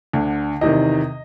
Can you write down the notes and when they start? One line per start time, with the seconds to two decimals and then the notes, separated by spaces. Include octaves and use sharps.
0.13 D2 D3
0.61 E2 C3 D#3 D#5